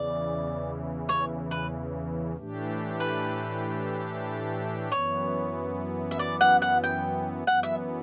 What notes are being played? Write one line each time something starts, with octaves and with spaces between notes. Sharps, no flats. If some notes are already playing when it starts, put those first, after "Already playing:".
Already playing: E2 C#3 E3 D5
C#5
B4
A2 E3 A3 D4 G4
B4
F#2 E3 B3 C#5
E5
D5
F#5
F#5
G5
F#2 E3 B3 F#5
E5